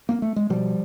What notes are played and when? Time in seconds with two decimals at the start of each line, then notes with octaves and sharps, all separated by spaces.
0.09 A#3
0.22 A3
0.36 G#3
0.50 B2 F3 G3